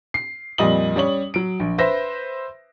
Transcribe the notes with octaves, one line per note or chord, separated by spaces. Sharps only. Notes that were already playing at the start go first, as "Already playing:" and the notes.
C7
F2 A#2 G3 D#5 D#6 F#7
G3 C#4 C#5 F#7
F#3 D7
A#1
B4 C5 E5 A#6